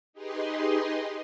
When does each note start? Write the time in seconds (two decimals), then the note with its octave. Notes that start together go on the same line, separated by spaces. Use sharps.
0.13 D#4 G4 G#4 B4 D#5 C6